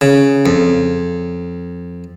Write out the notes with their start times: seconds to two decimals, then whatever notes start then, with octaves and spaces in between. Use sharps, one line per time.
0.01 C#3
0.46 F2